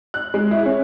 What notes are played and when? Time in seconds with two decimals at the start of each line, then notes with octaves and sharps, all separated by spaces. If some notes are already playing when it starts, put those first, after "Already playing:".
0.14 F#6
0.34 G#3
0.51 E4
0.66 C#4